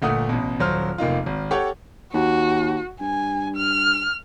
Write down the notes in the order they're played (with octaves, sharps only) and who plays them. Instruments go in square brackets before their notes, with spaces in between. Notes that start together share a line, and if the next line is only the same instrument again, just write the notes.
[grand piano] G1 A#2 A3 F#5 D#6
A1 B2
D#1 F#3 C5 F6
F1 A#3 D#4 F4
G#1
G4 A4 C#5 F#5
[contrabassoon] D#2 [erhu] F#4
[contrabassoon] G2 [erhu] G#5
[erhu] F6